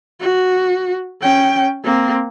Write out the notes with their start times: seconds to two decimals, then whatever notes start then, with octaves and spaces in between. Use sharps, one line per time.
0.21 F#4
1.21 C#4 G5
1.84 A#3 C4